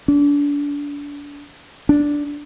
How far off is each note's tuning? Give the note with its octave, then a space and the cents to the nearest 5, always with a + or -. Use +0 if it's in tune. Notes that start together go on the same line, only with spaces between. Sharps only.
D4 -30
D4 -5